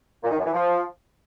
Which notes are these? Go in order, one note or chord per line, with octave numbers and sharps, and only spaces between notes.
A#2
D#3
F#2
E3
F3